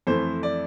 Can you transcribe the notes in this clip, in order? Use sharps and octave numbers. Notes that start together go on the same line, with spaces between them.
F2 E3 A3 C5
D5